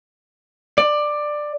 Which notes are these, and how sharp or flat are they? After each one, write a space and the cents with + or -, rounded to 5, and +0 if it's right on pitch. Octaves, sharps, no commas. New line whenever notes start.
D5 +15